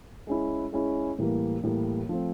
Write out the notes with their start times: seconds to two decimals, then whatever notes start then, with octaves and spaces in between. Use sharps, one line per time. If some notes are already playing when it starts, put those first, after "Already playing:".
0.27 G#3 C#4 E4
0.72 G#3 C#4 E4
1.19 A2 E3 G3 A#3
1.63 A2 E3 G3 A#3
2.09 F3 A3 C4